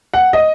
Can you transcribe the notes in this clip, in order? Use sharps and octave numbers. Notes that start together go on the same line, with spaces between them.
F#5
D#5